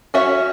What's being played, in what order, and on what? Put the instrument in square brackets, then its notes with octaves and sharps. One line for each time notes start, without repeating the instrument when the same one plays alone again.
[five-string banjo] C#4 F#4 C#5 E5